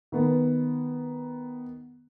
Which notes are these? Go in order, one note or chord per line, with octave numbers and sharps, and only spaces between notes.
D#3 B3